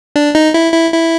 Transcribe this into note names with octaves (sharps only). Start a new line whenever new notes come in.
D4
D#4
E4
E4
E4